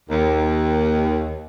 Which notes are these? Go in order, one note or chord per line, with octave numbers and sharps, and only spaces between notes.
D#2